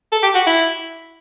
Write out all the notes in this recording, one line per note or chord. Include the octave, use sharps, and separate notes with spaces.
A4
G4
F#4
E4